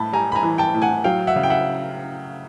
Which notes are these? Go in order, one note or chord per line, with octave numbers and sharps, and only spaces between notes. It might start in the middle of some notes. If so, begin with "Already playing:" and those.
Already playing: A2 A5 B5
G3 G#5 A#5
B5
G#5 A#5
E3
G5 A5
A2
F#5 G#5
F#3 F5 G5
E5 F#5
C#3
G5
E5 F#5